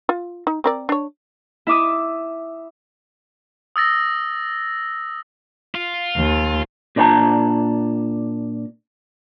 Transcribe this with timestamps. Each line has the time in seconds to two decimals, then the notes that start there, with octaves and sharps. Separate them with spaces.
0.09 F4
0.47 D#4
0.64 C4 A#4 D5
0.89 D4 C#5
1.67 E4 E5 D6 D#6
3.76 D#6 E6 A6 A#6
5.75 F4
6.16 D#2
6.96 A#2 D4 D#4 C5 A5 A#5